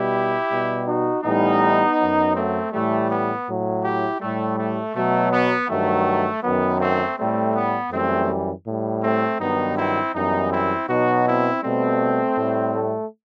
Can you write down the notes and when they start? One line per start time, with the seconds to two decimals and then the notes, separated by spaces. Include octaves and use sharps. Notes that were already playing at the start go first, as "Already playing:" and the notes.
Already playing: B2 G3 E4 G4
0.51 B2 G3
0.87 D#4 F#4
1.24 A2 E3 G3 B3 D#4
1.98 F#2 F#3
2.35 A3 C4
2.72 A2 E3 G3 A3
3.10 B3
3.47 A2 F#3
3.84 E4 G4
4.20 A2 G3 A3
4.59 A3
4.95 B2 F#3 A3
5.32 B3
5.69 G2 D#3 F#3 A3
6.43 F#2 D#3 F#3 B3
6.80 A3 C4
7.17 A2 G3 A3 C4
7.55 B3
7.91 F#2 E3 G3 A3 C4
8.66 A2 G3
9.03 A3 C4
9.40 G2 D#3 F#3 B3 D#4
9.77 C4 E4
10.14 F#2 E3 G3 B3 D#4
10.51 C4 E4
10.88 B2 F#3 D#4 F#4
11.26 C4 E4
11.62 B2 G3 A3 C4
12.36 A2 G3
12.74 A3